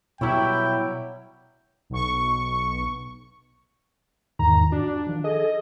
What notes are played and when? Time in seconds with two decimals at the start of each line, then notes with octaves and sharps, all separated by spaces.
0.21 B2 F#3 G3 E4 C#5 G5
1.90 B1 C#6
4.39 E2 G#2 D#3 A#5
4.72 D4 F#4
5.07 D#3 F3
5.24 G#4 A4 D#5